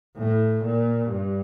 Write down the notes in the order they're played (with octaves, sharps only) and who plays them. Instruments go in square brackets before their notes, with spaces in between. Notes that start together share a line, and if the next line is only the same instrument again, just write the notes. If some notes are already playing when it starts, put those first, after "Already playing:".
[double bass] A2
A#2
G2